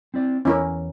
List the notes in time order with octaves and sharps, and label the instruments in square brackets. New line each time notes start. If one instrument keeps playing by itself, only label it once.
[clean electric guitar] C4 E4 D5
[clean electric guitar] E2 [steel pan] C#4 E4 A#4